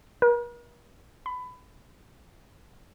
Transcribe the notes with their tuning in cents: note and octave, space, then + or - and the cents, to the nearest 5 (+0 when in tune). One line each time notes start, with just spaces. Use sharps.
A#4 +45
B5 +20